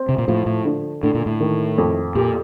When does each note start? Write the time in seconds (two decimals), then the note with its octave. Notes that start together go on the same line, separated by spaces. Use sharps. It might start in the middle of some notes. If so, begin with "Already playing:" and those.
Already playing: C4
0.09 C3
0.18 A#2
0.28 A2 F3
0.46 A2
0.65 D3
1.03 A2 D3
1.15 A#2
1.26 A2
1.40 D#3
1.78 F2
2.15 A#2 G4